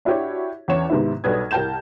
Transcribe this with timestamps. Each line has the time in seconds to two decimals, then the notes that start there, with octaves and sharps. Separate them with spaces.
0.05 D4 E4 F#4 G4 C#5
0.68 E2 E3 C#4 C#5 E7
0.90 G#2 C3 D#3 B3 D#4 E4
1.24 B1 G3 A4 B4 D#6 G#6
1.51 C2 A#4 G5 A5 G6 E7